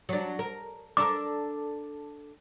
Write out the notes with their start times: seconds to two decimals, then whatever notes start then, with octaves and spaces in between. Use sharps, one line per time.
0.09 F#3 D4
0.39 A#4
0.97 D4 A4 A#4 D6